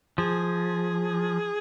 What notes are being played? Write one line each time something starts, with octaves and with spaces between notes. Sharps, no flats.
F3 G#4